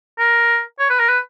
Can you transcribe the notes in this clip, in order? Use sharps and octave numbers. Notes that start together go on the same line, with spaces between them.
A#4
C#5
B4
A#4
B4